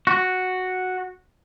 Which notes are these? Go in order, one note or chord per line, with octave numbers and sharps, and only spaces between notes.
F#4